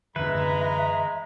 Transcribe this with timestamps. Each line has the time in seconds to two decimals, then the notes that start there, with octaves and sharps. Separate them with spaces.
0.16 F#2 D3 E3 G#3 B4 E5 A#5